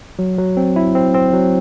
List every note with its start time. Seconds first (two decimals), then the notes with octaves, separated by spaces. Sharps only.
0.19 F#3
0.38 F#3
0.57 C4
0.76 E4
0.95 C4
1.14 C4
1.33 F#3